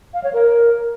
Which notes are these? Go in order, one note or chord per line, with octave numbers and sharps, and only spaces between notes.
F5
C#5
A#4